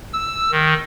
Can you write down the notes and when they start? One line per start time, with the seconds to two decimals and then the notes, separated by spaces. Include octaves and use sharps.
0.13 E6
0.52 D#3